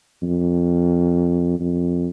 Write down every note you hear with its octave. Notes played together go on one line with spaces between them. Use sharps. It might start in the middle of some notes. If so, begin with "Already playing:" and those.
F2
F2